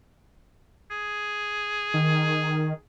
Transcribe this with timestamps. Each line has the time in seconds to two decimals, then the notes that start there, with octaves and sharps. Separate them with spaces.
0.91 G#4
1.94 D#3